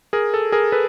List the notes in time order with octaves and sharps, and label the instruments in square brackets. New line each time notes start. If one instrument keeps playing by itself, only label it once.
[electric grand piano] G#4 A#4
A4
G#4 A#4
A4 B4